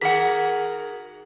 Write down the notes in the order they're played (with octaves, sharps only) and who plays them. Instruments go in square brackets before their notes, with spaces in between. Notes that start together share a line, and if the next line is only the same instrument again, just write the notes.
[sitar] D#3 F#4 A#4 [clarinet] G#4 [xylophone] F#5 B6